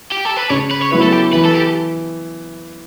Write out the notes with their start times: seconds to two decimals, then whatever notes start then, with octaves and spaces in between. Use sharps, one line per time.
0.12 G4
0.25 A4
0.37 B4
0.50 C#3 C#5
0.71 B4
0.82 C#5
0.92 F#3 B3 E4 B4
1.03 A4
1.13 G4
1.33 E3 B4
1.45 A4
1.54 G4